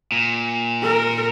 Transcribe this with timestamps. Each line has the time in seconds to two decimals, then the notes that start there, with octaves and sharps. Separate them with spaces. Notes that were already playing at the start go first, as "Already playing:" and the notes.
0.12 A#2
0.83 A#4